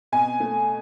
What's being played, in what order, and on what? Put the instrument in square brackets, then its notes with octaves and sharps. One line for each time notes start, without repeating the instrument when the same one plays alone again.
[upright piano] B2 G#5
A3